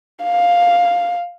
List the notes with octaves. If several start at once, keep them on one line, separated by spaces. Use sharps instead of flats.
F5